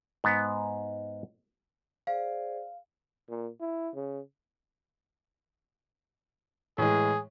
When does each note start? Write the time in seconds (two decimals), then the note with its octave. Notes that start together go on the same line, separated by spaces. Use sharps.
0.24 G#2 B3
2.07 G#4 C5 D5 F5
3.29 A#2
3.61 E4
3.94 C#3
6.78 A2 E3 G#3 G#4